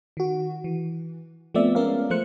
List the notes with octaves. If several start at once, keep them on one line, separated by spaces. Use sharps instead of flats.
D#3 F#4
E3
F3 A3 B3 C4 D5 E5
G#3 B3 C#4 A#4 D5 F5
F3 A3 C5 F#6 C#7